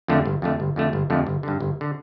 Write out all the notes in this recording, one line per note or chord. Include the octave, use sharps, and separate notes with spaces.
F2 D3 A3
G1
F2 D3 A3
G1
F2 D3 A3
G1
F2 D3 A3
G1
G2 D3
G1
D3